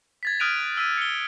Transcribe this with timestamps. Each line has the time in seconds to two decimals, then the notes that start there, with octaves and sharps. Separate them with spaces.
0.23 G#6 A6 B6
0.40 D#6 F6 F#6 D7 D#7 F7
0.56 F7
0.77 E6 B6 D#7
0.98 C#7 G7